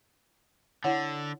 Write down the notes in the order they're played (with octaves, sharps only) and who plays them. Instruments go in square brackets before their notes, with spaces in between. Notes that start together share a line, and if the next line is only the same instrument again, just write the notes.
[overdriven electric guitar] D3 [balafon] E4 C#5 F#5